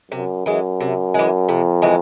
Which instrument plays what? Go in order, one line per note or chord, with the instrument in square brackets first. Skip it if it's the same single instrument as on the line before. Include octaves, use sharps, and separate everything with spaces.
[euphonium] F#2 [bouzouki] C3
[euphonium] F#2 [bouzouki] E3 G#3
[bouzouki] C3
E3 G#3
[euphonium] F2 [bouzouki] C3
[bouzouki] E3 G#3